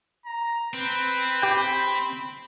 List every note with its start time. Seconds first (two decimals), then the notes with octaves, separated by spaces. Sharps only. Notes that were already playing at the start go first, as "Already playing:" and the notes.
0.26 A#5
0.74 C4 B4
1.42 G4 G5 B5